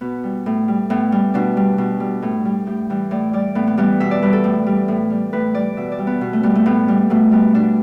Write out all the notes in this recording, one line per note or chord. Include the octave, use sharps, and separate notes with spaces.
B2 B3
G3
A2
G3
A2 B3
G3
B2 D4
G3
B2
G3
A2
G3
A2 G4
E3 G3
A2 D5
G3 D5
A2 B3
B3
E3 G3 B3
B2 E5
D5
G3 B4
A4
A2
G3
A2
G3
A2 B4
G3 D5
B2 E5
D5
G3
B3
B2
A3
G3 B3
A3
A2 B3
G3
B2 A3
G3 B3
B2 D4